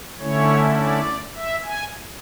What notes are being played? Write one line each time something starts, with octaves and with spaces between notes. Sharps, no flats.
D3 A3 C#4 E4 C#5
D5
E5
G#5